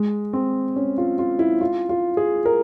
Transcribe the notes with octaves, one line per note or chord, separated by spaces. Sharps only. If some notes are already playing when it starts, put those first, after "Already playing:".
Already playing: G#3
C4
C#4
F4
F4
E4
F4
F4
G#4
A#4